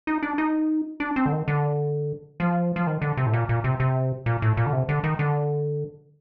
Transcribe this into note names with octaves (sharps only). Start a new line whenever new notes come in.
D#4
D4
D#4
D4
C4
D3
D#3
D3
F3
F3
D#3
D3
C3
A2
A#2
A#2
C3
C3
A#2
A2
A#2
D3
C3
D3
D#3
D3